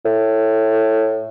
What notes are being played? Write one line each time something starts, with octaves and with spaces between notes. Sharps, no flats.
A2